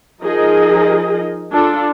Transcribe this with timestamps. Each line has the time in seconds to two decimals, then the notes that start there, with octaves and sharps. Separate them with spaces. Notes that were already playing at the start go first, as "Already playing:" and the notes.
0.23 F3 D#4 G#4 A#4 D#5
1.53 D4 F4 A4